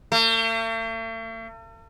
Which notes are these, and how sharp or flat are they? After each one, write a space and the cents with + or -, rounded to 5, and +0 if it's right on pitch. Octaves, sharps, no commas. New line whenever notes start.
A3 +45